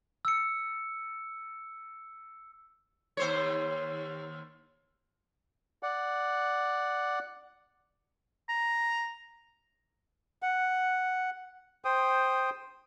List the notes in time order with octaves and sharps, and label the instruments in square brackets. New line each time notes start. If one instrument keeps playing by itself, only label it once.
[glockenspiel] E6 C#7
[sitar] D#2 C5 C#5
[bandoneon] D5 F#5
[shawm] A#5
[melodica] F#5
C5 G5 D#6